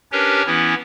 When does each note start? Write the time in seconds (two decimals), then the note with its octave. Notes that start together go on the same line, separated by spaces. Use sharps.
0.12 C#4 D4 G4 A#4 B4 C#5
0.46 E3 B3 C#4 E4